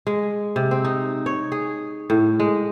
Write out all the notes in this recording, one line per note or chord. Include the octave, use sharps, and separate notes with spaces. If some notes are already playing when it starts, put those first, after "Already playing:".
G#3
C3
C4
D#4
C#5
G#4
A2
G#3